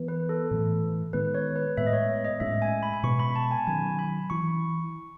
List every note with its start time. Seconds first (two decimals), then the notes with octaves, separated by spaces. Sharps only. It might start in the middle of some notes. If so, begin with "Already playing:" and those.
Already playing: E3 B3
0.08 B4
0.29 A4
0.51 A2 E3 A3
1.13 D#3 G#3 B3 B4
1.35 C#5
1.56 B4
1.77 A2 G#3 B3 E5
1.87 D#5
1.93 C#5
2.25 D#5
2.40 A2 G#3 C#4 E5
2.62 G#5
2.83 B5
2.94 B5
3.03 B2 G#3 B3 C#6
3.19 B5
3.36 A5
3.51 G#5
3.67 D#3 F#3 C#4 G#5
3.99 B5
4.30 E3 C#6